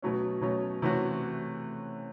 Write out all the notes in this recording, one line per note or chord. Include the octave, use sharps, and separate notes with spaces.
B2 F#3 A3 C#4
B2 F#3 A3 C#4
C3 E3 A3 C#4 F#4